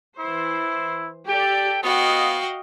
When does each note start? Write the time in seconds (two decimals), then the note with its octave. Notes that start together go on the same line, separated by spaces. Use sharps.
0.19 E3 E4 C5
1.29 G4 A4 D5 G5
1.83 B3 F#4 D#5 F5 G5